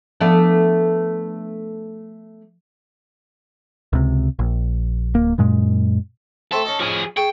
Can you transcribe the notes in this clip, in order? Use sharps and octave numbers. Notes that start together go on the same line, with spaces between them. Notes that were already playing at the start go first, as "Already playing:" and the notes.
F3 A3 B3 D4
C#2 C3
A#1
D1 A#3
F#2 A#2 G#3
A3 C4 A4 E5
C#4 D#4
F3 G#4
G#4 G5 A5 C#6